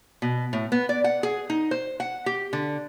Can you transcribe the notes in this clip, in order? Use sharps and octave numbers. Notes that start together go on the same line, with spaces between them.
B2
A2
B3
D5
F#5
G#4
D#4
C5
F#5
G4
D3